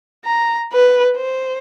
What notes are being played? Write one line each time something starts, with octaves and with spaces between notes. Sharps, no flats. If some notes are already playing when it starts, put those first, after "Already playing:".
A#5
B4
C5